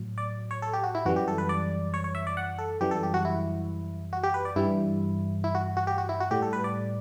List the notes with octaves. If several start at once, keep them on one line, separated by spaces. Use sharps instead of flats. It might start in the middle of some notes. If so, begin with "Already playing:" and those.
Already playing: A2 F#3
D5
C#5
A4
G4
F#4
E4
F#2 E3 G3 F#4
G4
A4
B4
D5
C#5
C#5
E5
D5
F#5
A4
F#2 E3 G3 G4
A4
G4
F#4
E4
F#4
G4
B4
D5
G2 E3 G3 E4
E4
F#4
F#4
G4
F#4
E4
F#4
A2 G3 G4
A4
B4
D5